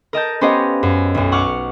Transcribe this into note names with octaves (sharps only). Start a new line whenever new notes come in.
A#4 D#5 A5 G6
B3 C#4 G4 C5 D#5 F5
F#2
B1 F#2
F#5 C#6 D6 F6